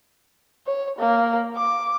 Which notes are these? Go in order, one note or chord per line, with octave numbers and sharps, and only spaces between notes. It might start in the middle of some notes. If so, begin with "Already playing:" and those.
C#5
A#3
D6